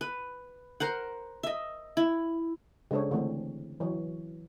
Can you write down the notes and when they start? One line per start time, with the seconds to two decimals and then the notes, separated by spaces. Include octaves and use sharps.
0.01 B4
0.80 A#4 C5 F#5
1.43 D#5 E5
1.97 E4
2.91 C#3 G#3 D4 A4 C5 C#5
3.11 D3 E3 A3 C4
3.80 E3 F#3 C#5